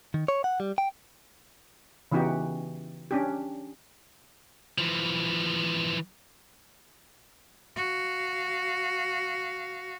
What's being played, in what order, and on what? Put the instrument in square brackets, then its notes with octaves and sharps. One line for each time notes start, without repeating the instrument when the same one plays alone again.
[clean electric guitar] D#3
C#5
F#5
G3
G5
[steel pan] C#3 E3 B3 D#4 F#4 G4
C#4 D4 G4
[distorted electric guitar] E3 F3
[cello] F#4 F5